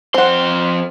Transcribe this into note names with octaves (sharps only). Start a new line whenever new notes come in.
F2 C4 F#5 C6